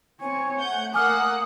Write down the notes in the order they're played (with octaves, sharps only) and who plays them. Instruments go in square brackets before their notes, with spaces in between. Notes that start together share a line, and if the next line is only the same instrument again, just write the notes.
[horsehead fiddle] C4 C#5 [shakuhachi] G#5
[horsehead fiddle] A3 [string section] F#5 G6
[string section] A#3 F#5 [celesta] G#5 D6 F6 [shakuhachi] D#6